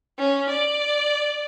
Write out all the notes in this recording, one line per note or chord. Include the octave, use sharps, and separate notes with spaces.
C#4
D5